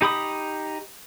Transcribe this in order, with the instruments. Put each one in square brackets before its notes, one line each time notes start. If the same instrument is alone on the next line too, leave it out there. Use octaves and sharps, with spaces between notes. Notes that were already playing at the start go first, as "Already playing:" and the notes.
[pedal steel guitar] D#4 G4 B5 D#6